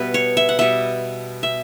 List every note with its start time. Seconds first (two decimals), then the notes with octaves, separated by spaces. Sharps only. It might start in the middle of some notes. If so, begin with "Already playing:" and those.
Already playing: B2 G3 B3 B4 E5
0.14 C#5
0.37 E5
0.49 F#5
0.59 B2 G3 B3 E5
1.43 E5